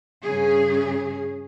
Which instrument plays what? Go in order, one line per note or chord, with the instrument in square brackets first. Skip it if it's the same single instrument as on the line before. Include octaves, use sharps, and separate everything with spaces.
[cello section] G2 C#3 C#4 G#4